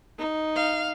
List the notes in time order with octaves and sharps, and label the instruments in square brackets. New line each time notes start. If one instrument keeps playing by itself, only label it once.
[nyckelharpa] D#4
[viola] F5